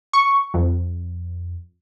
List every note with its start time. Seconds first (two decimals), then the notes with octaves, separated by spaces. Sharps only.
0.13 C#6
0.54 F2